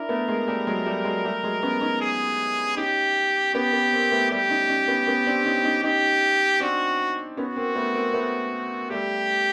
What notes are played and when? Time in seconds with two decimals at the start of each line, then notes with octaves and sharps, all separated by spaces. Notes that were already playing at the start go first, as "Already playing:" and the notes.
Already playing: D4 E4 A#4
0.09 A3 B3
0.28 G#3 A#3
0.48 G3 A3
0.67 F#3 G#3
0.86 G3 A3
1.05 F#3 G#3
1.24 G3 A3
1.43 F#3 G#3
1.63 B3 C#4
1.81 C#4 D#4
2.01 G#4
2.77 C#4 D#4 G4
3.54 B3 C#4 G4
3.73 B3 C#4
3.92 A#3 C4
4.11 A3 B3
4.31 G3 A3 G4
4.49 C#4 D#4
4.69 C#4 D#4
4.88 B3 C#4
5.07 B3 C#4
5.26 C4 D4
5.45 C#4 D#4
5.65 C#4 D#4
5.84 C#4 D#4 G4
6.60 C4 D4 F#4
7.37 B3 C#4 F#4
7.56 A#3 C4
7.75 A3 B3
7.94 A#3 C4
8.14 A3 B3
8.90 G3 A3 G4